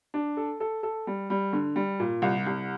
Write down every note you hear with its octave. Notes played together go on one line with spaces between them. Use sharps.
D4
A4
A4
A4
G3
G3
D3
G3
A#2
C2
C2